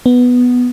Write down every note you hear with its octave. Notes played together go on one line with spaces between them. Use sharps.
B3